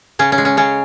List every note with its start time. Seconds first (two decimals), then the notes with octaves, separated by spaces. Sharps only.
0.19 C#3 C#4
0.32 C#4
0.38 G#3
0.45 C#4
0.57 C#3 C#4